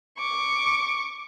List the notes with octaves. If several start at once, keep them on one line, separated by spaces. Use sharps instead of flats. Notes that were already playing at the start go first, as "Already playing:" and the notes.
C#6 D6